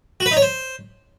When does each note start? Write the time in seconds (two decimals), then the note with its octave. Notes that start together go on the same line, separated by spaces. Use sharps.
0.20 F#4
0.26 B4
0.31 D#4
0.37 C#5
0.42 C5